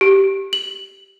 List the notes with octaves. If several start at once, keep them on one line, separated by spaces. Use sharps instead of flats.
G4
F#7